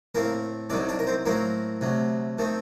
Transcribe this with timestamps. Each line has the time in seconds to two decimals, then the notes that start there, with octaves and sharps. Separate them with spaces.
0.15 A2 A3 A#3 C4 A#4
0.70 C2 C3 D#3 F#3 D4 D5
0.89 D4 D5
0.99 A#4
1.07 C4 C5
1.26 A2 F#3 A#3 C4 A#4
1.81 D2 C3 F#3
2.38 D#3 A3 C4